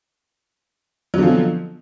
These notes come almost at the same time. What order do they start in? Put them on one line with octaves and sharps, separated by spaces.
F#3 D3 F3 B2